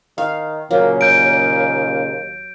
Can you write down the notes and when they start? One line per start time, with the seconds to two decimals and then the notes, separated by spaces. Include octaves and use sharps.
0.18 D#3 F5
0.71 A#2 C#3 F#3 A#3
1.01 D#2 G6 D7